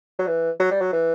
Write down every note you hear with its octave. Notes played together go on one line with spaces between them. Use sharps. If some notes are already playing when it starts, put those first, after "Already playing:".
F#3
E3
F#3
G3
F#3
E3